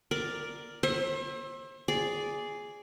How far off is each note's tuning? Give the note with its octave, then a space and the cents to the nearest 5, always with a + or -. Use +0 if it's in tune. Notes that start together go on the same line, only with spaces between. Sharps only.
A#4 +5 D5 +0
C5 +40 E5 +0
G#4 +0 D5 -10